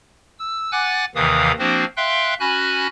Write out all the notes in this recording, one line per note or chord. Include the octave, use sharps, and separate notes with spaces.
E6
F#5 G#5 D6 F#6 A6
D#2 C3 D#3 E3 F5 D#6
F3 A#3 C4 D4 F#4 C5
E5 F5 G5 C6 F#6
C#4 F#4 G#5 B5 F#6